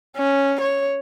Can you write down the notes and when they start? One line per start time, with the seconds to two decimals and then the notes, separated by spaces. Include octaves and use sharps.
0.17 C#4
0.61 C#5